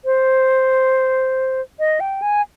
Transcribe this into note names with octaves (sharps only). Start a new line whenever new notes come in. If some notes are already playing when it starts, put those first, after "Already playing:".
C5
D#5
G5
G#5